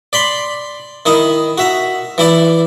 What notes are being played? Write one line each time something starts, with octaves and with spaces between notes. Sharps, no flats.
D5 B5 C6
D#3 E4 D#5
F#4 E5 A#5
E3 E4 D5